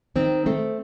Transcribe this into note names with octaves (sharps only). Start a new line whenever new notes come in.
D#3 C4
A3 C4